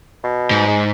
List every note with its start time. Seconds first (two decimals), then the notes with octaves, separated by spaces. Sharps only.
0.24 B2
0.51 G#2
0.68 G#3